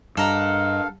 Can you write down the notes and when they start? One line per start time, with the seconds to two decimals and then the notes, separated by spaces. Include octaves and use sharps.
0.17 G2 A4 A#4 D#5 F5 F#5